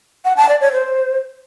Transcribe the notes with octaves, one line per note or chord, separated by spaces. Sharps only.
F#5
A5
D5
C#5
C5